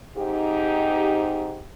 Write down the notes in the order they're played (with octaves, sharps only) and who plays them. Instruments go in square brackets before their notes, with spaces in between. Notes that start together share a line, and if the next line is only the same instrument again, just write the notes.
[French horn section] G#2 C3 D#4 G4